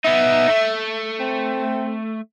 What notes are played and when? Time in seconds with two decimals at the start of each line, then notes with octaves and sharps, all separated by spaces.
0.05 B3 D#4 E5
0.49 A3
1.20 C4